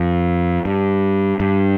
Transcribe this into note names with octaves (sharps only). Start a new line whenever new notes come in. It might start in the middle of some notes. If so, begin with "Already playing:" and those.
Already playing: F2
G2
G2